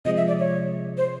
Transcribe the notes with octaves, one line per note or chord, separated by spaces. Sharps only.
C3 F3 G#3 D#5
E5
D5
C#5
C5